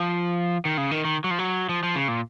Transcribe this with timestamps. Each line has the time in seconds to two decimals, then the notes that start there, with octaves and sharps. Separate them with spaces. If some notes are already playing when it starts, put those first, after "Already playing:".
Already playing: F3
0.65 D#3
0.78 C#3
0.91 D#3
1.05 D#3
1.24 F#3
1.31 F3
1.39 F#3
1.69 F3
1.83 F3
1.95 C#3
2.08 A#2